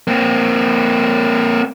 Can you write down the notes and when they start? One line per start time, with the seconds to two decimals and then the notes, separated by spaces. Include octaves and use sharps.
0.07 A#3 C4